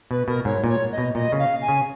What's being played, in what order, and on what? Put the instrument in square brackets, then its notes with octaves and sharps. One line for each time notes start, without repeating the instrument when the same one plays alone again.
[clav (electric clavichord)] B2 [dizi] B4
[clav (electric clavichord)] B2 [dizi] A#4
[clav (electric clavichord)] G#2 [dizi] C#5
[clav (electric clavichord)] A#2
[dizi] C#5
D#5
[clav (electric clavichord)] B2
[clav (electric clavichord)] A#2 [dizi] D#5
[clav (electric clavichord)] C#3
[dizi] F5
G#5
[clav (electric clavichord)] C#3